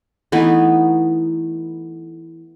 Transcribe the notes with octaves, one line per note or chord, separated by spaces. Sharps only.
E3 A3 B3 D#4